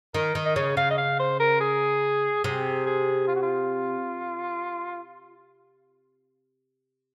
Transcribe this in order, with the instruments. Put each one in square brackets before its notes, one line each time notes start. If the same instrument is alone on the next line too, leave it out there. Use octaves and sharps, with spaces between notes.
[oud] D#3 [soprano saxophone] A#4
[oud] D#3
[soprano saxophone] D#5
[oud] C#3 [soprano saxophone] C#5
[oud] C#3 [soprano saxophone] F5
[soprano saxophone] D#5
F5
C5
A#4
G#4
[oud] C3 [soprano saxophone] G#4
[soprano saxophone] G#4
F4
F#4
F4